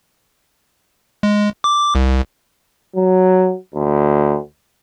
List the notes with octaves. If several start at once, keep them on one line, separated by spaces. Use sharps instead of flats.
G#3
D6
C2
F#3
D2